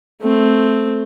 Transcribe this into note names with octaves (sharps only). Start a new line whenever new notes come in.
A3 C4